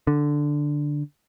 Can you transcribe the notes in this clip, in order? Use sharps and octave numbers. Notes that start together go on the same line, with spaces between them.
D3